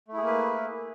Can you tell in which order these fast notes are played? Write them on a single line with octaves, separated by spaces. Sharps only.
A3 E4 G#4 A#3 B4